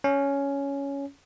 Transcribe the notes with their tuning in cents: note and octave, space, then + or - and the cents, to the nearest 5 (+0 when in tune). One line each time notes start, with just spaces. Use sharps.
C#4 +10